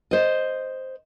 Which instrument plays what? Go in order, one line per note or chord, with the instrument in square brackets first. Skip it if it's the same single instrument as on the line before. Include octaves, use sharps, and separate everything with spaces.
[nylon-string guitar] C5 D#5